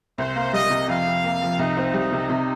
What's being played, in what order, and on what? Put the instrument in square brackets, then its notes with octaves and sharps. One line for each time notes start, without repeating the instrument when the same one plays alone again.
[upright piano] C2 [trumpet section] C5
[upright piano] A#3
[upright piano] G3 [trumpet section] D#5
[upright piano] C3
[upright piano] F2 [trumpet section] F5
[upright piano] F2
A#3
F3
[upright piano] C2 [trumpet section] D#4
[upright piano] C4
G3
C3
C3